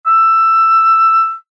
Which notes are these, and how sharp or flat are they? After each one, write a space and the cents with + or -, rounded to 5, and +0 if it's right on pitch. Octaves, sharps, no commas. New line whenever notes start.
E6 +10